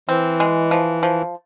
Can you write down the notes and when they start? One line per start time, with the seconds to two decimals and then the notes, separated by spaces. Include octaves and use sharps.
0.09 E3 C4
0.40 G#3
0.71 F3
1.03 F3